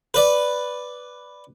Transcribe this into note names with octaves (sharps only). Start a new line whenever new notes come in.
B4 D5